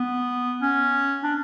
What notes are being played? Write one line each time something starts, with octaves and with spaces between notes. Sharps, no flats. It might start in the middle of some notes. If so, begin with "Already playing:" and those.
Already playing: B3
C#4
D4